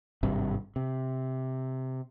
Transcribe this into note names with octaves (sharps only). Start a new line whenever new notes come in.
G#1 G2 C3
C3